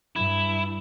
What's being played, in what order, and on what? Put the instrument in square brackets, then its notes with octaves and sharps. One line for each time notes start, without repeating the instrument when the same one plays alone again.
[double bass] G2 [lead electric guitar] E4